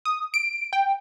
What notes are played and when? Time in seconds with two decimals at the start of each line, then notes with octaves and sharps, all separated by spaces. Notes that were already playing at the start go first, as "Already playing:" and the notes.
0.05 D#6
0.34 D7
0.73 G5